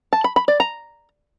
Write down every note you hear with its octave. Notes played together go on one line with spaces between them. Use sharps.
A5
B5
B5
D5
A#5